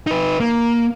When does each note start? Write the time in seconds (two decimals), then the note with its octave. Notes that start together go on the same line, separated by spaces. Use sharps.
0.07 D#4 B4
0.40 A#3